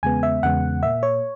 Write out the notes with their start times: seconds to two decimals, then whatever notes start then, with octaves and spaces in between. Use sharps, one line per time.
0.03 E2 C#3 G#3 B3 G#5
0.23 E5
0.43 E2 C#3 G#3 B3 F#5
0.83 A#2 A#3 E5
1.03 C#5